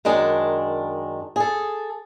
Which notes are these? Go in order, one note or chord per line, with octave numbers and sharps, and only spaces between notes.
F#2 D#3 G#3 D4
G#4 A4